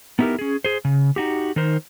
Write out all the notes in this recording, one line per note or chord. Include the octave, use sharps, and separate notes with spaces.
B3 D#4 E4 G4 A#4
C#4 G#4
G#4 C5
C#3
D#4 F#4 G4
D#3 D#4 A#4 C5